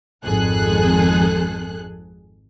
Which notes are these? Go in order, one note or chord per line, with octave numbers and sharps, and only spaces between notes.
G#1 F2 G#4 A4 F#6